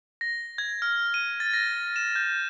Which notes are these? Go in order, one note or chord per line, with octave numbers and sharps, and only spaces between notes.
A#6
G#6
F6
D#7
A6
A#6
E7
G6